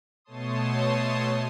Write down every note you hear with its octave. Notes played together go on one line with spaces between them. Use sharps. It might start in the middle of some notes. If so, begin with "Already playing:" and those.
B2 A3 C#5 A5 C6 D#6